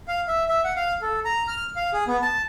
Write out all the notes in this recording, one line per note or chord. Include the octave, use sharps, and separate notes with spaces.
F5
E5
E5
F#5
F5
A4
A#5
F6
F5
G#4
B3
A5